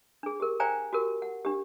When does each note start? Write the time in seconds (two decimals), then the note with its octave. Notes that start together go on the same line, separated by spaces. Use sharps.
0.23 D4 G#4
0.40 G4 A#4
0.60 C5 D5 F5 G5 G#5 A#5
0.93 F#4 G4 A#4
1.22 F#5
1.45 D4 G4